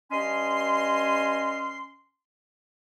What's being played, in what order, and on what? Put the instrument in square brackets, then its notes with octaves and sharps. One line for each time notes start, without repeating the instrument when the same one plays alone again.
[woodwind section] G2 C#4 D#5 G#5 C6